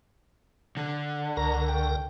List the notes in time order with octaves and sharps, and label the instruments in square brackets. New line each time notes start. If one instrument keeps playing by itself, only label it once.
[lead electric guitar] D3
[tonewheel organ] C#2 A#4 [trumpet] A#5
[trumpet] G5